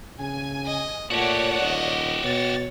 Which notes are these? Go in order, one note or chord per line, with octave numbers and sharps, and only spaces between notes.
C#3 G#5
D#5
A#2 A3 F#4 G4 C#5 D5 F#5
D#1 D#5
B2 C#5 A6